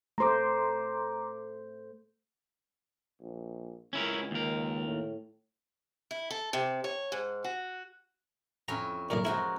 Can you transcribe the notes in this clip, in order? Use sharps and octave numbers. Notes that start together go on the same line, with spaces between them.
A3 C5 A#5 C6 D6
A#1
C#2 C#4 E4 A#4
D#2 A#4
A2
E4
A4
C3
C#5
G#2
F#4
F2 C#4 E4 A#5
B1 F#2 A#2 A#4
F3 G#3 E4 F#4